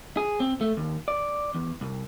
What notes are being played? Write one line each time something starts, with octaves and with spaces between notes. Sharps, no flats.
G#4
C4
A3
D#2
D5
E2
C2